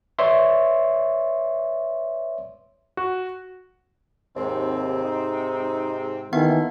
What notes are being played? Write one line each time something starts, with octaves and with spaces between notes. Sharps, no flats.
B4 C#5 D5 E5 C6
F#4
D#2 G#2 C3 C4
D#4
D#2 D#3 E3 A#3 B3 A4 F#5